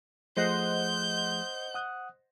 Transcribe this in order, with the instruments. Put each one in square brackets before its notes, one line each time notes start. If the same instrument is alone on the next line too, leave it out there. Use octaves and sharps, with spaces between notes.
[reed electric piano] F3 A3 G#4 [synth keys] C5 D#5 F#5 [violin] G6
[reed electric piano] F#5 D#6 F#6